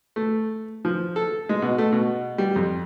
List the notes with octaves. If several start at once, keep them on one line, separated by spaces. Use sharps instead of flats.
A3
F3
A4
G#3
B2
A3
B2
G3
F2